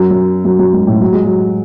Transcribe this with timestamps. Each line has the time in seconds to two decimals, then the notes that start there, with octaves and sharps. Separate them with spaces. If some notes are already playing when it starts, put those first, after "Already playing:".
Already playing: F#2
0.11 F#2
0.45 F#2
0.59 F#2
0.73 G#2
0.87 A2
1.01 F#3
1.13 G#3
1.25 F#3